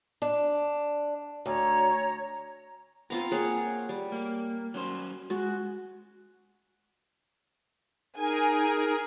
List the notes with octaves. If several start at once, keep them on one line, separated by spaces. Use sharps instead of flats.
D4
D2 C#5 A#5
B3 C4 F4 F5 A#5
A#3 C4 G#4 C#5 F#5
G3
A#3
F#3 C#4 C5
G#3 F#4
D#4 G#4 A#4 G#5